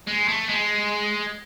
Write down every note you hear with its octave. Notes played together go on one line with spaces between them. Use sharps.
G#3
A3
G#3